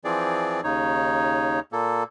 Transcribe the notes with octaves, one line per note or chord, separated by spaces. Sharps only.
E3 F3 C4 G#4 D5
D#2 C#3 D#4 C#5
A#2 A#3 A4